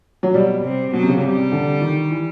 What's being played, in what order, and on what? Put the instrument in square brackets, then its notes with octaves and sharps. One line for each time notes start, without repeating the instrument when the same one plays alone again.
[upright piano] F#3
[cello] B2 [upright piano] G3
[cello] C3
[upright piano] B2 [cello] F#3
[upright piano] C3
C#3
[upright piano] C3 [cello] G3
[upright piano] C3
D3
D#3
E3